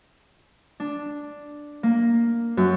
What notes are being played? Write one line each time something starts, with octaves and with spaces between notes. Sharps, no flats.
D4
A#3
F#2